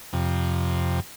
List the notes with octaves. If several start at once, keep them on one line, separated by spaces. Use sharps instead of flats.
F2 C3